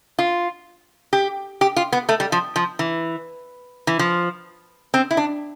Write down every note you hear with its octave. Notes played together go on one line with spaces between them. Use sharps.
F4
G4
G4
F4
B3
A3
G3
F3
F3
E3
E3
F3
C4
E4
D4